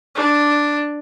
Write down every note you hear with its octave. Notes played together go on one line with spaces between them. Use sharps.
D4